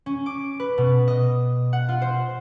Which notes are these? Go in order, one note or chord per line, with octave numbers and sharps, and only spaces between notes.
C#4
D6
B4
B2
D#5
F#5
F4
C5